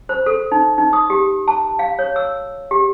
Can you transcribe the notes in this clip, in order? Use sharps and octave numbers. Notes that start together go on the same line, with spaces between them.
C5
A4
D#4
D#4
D#6
G4
A5
F5
C#5
E6
G4